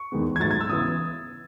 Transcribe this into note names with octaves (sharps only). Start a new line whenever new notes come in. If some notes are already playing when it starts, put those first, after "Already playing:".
Already playing: C#6
E2 D#3 G#3 B3
G#6
G#2 F#3 A3 A6
G#6
E6
C#3 E3 B3 D#6